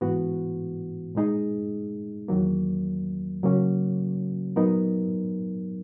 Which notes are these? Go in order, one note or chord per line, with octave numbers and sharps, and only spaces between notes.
G#2 E3 B3 F#4
A#2 G#3 D#4 G#4
E2 D#3 F#3 A#3
C#3 F#3 A#3 C#4 F#4
A#2 F#3 B3 D#4 A#4